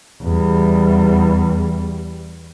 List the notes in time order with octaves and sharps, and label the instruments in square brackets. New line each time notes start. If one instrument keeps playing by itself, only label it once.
[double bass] E2 G3